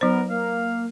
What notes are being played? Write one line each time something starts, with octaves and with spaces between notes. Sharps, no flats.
F#3 B3 D#4 A#4 C5
A#3 F5